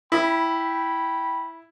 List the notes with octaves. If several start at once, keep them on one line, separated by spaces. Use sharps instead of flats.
E4 G5 B5